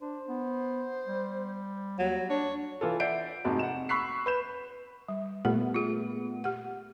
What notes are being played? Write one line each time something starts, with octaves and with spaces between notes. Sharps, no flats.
D4 C5
B3
G3
D#2 F#3
D4 C#5
E3 F4 A4
D5 E5 F#5 G6 C7 D7
F1 G#2 C3 F#4 A5
F#5 E7
B5 C#6 E6 F#6 B6 C7
B4 G6 E7
G3
A#2 A3 B3 G4
F4 G#4
G4 F#5